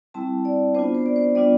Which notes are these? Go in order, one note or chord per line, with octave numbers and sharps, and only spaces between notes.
G3 C4 E4 A5
D5
B3 D4 F4 C5
C5
D5
C5
G3 B3 D4 F4 D5